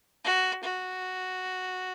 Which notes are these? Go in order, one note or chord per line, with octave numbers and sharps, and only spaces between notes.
F#4
F#4